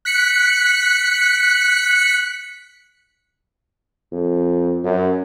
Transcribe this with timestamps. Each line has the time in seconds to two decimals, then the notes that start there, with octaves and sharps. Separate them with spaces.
0.05 F#6 B6 C#7
4.12 F2
4.84 F#2